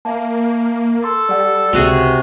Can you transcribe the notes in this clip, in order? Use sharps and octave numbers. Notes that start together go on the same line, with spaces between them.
A#3 E5 F5 A5
A4 C6
G3 D5 F#5
C#2 C3 F#4 G#4